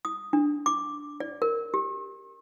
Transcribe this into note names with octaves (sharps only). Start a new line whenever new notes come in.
D#6
D4
D6
D5
A#4
G4